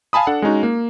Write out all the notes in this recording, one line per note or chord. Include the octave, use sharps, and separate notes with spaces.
F5 G#5 A5 B5 D#6
D4 A4 F#5
G#3 C#4 D#4 F#4
A#3